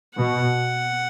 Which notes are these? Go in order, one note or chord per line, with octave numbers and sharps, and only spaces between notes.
B2 F#5